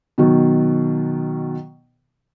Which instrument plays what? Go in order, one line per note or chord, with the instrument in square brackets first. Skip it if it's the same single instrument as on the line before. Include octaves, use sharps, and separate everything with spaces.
[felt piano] B2 D#3 F#3